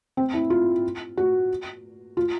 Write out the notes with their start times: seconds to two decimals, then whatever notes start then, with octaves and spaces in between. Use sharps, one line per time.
0.17 C4
0.34 E4
0.50 F4
1.17 F#4
2.17 F4